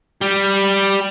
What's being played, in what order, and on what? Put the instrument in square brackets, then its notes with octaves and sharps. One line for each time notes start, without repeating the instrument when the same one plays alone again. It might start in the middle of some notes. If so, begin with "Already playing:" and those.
[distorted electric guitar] G3